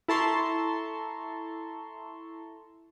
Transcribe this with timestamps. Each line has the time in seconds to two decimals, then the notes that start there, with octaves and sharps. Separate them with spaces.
0.08 E4 A4 A5 A#5 C6 C#6